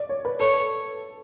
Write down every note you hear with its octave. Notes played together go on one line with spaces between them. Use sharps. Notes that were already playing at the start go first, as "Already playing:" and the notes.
Already playing: D5
C#5
B4
A4 C#5